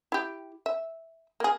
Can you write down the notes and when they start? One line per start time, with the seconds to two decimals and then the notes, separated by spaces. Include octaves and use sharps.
0.12 E4 G4
0.66 E5
1.40 A#3 G#4